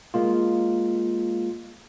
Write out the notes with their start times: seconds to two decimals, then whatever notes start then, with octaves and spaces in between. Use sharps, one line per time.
0.14 G#3 A#3 F4